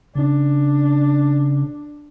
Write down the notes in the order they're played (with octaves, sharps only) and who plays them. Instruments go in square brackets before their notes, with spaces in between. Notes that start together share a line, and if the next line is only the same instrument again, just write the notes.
[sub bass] C#3 [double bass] D4